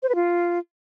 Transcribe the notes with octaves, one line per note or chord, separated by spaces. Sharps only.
C5
B4
F4